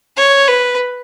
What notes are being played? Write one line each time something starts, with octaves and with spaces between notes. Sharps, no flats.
C#5
B4